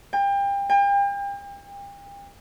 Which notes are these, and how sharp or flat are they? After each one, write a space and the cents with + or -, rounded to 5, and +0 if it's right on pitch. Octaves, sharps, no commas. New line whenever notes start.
G5 +30
G5 +40